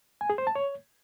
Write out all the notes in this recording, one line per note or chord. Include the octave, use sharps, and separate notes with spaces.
G#5
G#4
C5
A5
C#5